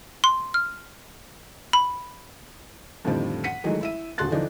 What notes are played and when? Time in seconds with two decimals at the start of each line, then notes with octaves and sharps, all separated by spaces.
0.24 C6
0.54 F6
1.73 B5
3.04 F2 A2 D3 D#3 F3 G3
3.44 F#5 B6 C#7 D#7
3.64 D#3 E3 F#3 G#3 A3
3.81 E4 E5 D#7
4.18 D#1 D3 F#4 C6 F#6 A6
4.32 D3 E3 F3 D4 D#4